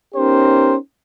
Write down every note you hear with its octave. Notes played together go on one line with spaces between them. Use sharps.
B3 C#4 D#4 G4 A#4 C5